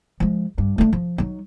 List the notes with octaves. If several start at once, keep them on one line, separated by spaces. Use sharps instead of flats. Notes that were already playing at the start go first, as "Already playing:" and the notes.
F3 G#3
G2
A3 D4
F3
F#3 D#4